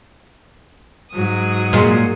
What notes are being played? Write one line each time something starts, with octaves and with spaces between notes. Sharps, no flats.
G#2 F#3 D#6
A#2 G#3